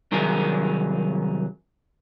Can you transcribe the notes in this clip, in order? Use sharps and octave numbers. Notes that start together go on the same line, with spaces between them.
C2 D#3 F#3 G#4 A#4